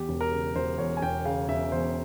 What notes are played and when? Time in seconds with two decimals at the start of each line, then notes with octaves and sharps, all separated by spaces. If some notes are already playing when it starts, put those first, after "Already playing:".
Already playing: E2 G4
0.09 E1
0.21 A#4
0.32 C#3
0.55 E1 C5
0.78 E2 C#5
0.97 G#5
1.02 E1 G5
1.25 C#3 F5
1.49 E1 E5
1.72 E2 C5